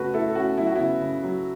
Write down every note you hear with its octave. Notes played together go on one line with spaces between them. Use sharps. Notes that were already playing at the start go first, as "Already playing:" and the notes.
Already playing: C#3 A3 F#4 B4
A3 E4 A4
A4
A3 C#4 F#4
F#3 E4
F#4
C#3 B3 E4
C#3
F#3